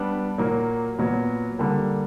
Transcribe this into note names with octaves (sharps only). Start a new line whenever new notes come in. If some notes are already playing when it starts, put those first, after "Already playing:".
Already playing: G3 B3 D4
A#2 F#3 A#3
A#2 F#3 B3
D3 G3 A#3